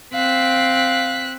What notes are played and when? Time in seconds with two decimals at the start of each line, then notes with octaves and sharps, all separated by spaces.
0.14 C4 F5 F#6 B6